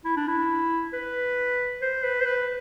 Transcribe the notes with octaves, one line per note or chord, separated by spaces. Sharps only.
E4
D4
E4
B4
C5
B4
C5
B4